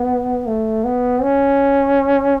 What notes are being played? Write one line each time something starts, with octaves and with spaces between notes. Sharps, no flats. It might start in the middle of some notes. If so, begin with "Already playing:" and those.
Already playing: B3
A3
B3
C#4